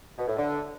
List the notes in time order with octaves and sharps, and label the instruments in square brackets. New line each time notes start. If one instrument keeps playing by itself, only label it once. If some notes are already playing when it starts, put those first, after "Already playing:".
[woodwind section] B2
A2
D3